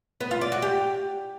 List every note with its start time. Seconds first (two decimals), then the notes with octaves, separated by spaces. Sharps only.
0.21 B3
0.31 F4
0.41 D5
0.52 F#4
0.62 G4